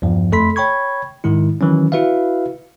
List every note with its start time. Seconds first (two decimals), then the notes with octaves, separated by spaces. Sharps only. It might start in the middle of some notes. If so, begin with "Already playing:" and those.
0.02 E2 G2 F3
0.32 F2 A3 A4 B5 C6 B6
0.56 C#5 G5 B5 C#6 G#6
1.24 G#2 D#3 G#3 E4
1.61 D#3 E3 F#3 C#4
1.92 E4 F#4 B4 E5 F5